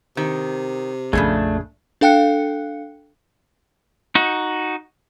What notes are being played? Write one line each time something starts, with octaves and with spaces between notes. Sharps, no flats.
C3 D#3
A#1 F2 C#3 F3 A3 D4 G#4
D4 A4 F5 G5 F#6 C#7
D#4 F#4